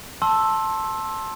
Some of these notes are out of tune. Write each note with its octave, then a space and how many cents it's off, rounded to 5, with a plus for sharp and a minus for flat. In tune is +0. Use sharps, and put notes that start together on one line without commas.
A5 +0 C6 +25 E6 +0